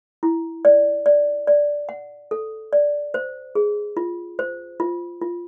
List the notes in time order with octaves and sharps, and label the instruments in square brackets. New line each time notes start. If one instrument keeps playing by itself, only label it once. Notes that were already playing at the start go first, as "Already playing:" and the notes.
[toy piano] E4
D5
D5
D5
F#5
A4
D5
C5
G#4
F4
C5
F4
F4